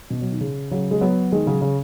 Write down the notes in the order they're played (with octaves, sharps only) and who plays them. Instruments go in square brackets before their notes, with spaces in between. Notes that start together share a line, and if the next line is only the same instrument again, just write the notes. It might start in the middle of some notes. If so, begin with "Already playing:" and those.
[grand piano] B2
F#3
D#3
C#3
C#3 F#3
G#3
F#3 B3
D#3 G#3
C#3 F#3
C#3